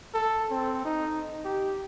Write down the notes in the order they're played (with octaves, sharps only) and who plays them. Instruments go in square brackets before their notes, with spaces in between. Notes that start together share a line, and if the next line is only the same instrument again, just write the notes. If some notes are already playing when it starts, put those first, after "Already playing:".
[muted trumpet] A4
C4
D#4
G4